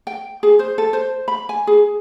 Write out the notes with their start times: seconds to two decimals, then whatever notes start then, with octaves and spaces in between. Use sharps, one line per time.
0.07 G5
0.43 G#4
0.59 C5
0.78 A4
0.93 C5
1.28 B5
1.49 G#5
1.67 G#4